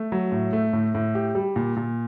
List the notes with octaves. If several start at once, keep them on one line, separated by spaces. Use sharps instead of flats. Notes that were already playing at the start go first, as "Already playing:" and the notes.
Already playing: A3
F#3
A2
A3
A2
A2
G4
G3
A#2
A#2